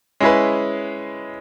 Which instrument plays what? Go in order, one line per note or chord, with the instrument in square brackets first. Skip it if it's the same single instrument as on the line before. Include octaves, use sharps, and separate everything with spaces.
[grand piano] G#3 C#4 E4 G#4 B4